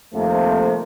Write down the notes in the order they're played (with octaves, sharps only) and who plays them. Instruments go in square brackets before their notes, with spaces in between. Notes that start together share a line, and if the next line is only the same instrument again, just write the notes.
[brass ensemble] F2 C3 D#3 F3 A3 A#3